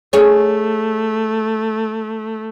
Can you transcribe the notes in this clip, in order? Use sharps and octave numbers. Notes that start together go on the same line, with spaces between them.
A3 G#4 C#5